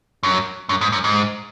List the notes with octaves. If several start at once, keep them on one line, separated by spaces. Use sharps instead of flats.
F#2
F#2
G#2
F#2
G#2